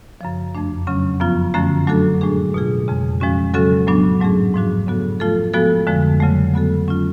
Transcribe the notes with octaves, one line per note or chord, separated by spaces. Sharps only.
F#2 C#3 F3
F2 F3 A3 D4
C#3 F#3 C#4
F#2 F3 B3 F4
F#2 D3 F3 A3 C#4
F#3 A3 D4 F#4 A4
A2 G#3 D4 G#4
B2 A3 F4 G#4
F2 C#3 G#3
F3 G#3 C#4 F#4
C#3 F#3 C#4 F#4 A4
A2 F#3 B3 D4
G#2 F#3 A3 C#4 G#4
G#2 F3 A3 D4 F#4
C#3 F#3 B3 F#4 A4
F3 A3 F4 A4
F3 G#3 B3 F#4 A4
F2 D3 F3 G#3
C#3 F#3 A3
F#3 B3 F#4 A4
F#3 C#4 F4